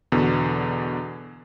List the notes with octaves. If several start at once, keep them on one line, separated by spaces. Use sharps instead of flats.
E2 B2 D3